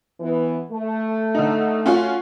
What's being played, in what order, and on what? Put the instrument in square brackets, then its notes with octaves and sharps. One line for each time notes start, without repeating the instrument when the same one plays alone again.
[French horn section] E3 B3
A3
[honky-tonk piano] D3 D#4
C#4 F4 F#4